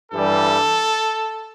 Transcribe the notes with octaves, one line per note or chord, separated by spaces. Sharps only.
G2 E3 G3 A4